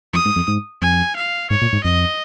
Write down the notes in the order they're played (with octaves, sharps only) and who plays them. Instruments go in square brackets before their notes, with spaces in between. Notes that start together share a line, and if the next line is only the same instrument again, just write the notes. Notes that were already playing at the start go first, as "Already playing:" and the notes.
[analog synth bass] F2 [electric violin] D#6
[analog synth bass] G#2
F2
G#2
[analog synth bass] F2 [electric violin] G#5
[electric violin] F5
[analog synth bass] G#2 [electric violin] C#5
[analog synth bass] A#2
G#2
[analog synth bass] F2 [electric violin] D#5